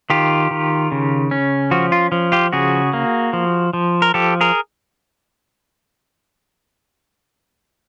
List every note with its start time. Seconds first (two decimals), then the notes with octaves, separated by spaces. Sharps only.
0.10 D#3 F4 G4
0.51 D#3
0.92 C#3
1.31 C#4
1.71 F3 F#4
1.92 F4
2.12 F3
2.32 F4 G4
2.53 C#3 F#4 G#4
2.93 A#3
3.33 F3
3.73 F3
4.02 A#4
4.14 F3 G4 A4
4.41 G#4 A#4